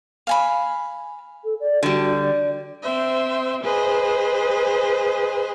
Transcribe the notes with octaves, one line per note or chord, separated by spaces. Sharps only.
F5 G#5 B5
A4
D5
D3 G3 F#4
D5
C4 C5 E5
G#4 B4 C5 D#5